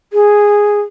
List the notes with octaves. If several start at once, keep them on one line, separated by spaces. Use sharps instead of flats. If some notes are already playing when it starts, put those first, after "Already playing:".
G#4